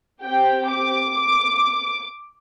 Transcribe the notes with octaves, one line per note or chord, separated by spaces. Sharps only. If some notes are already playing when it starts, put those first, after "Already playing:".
C4 G4 G5
D6